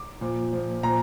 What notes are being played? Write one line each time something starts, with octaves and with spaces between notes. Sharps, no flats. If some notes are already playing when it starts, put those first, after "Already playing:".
Already playing: D6
A#2 F3
A#2 F3
A#2 F3 A#5